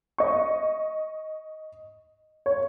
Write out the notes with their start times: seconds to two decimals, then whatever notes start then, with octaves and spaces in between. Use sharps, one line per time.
0.18 D#5 C#6
2.46 C#5